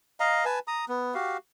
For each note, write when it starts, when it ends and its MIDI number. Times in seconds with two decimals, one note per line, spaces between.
0.20 0.45 75
0.20 0.45 77
0.20 0.45 82
0.45 0.59 71
0.45 0.59 80
0.45 0.59 81
0.67 0.85 82
0.67 0.85 87
0.88 1.14 59
1.14 1.37 66
1.14 1.37 67
1.14 1.37 77